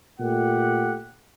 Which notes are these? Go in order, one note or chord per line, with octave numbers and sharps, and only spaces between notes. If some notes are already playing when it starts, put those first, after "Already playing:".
A#2 A3 G4 F#5